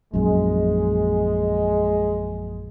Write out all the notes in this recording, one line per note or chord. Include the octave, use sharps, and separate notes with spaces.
A#1 F#2 G#3